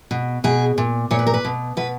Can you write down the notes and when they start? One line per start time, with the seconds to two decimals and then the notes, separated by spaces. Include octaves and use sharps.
0.11 B2
0.44 B2 G#4
0.78 A#2
1.11 A#2 C#5
1.19 B4
1.27 A#4
1.34 B4
1.45 B2
1.77 B2 B4